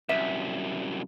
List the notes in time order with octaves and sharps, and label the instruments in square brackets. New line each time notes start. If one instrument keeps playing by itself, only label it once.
[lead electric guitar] C2 F#2 [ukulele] E5